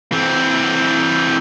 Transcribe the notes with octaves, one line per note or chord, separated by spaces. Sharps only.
E3 C4